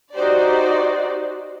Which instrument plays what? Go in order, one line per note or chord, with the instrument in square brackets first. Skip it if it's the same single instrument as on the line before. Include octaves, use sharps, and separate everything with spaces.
[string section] D#4 F#4 G4 C5 D5